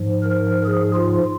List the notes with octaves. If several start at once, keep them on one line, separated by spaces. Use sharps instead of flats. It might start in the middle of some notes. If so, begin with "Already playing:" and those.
Already playing: G#2 F3
A#4
G#4
F4